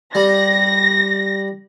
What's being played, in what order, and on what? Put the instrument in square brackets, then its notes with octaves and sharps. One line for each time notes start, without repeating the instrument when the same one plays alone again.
[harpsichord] G3 [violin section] A#6